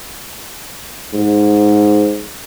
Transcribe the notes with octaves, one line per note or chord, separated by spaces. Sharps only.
G#2